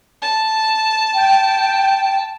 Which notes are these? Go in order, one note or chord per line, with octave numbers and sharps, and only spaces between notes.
A5
G5